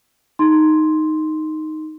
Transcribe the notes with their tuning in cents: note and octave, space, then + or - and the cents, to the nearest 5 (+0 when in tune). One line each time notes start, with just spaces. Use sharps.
D#4 +0 C6 +0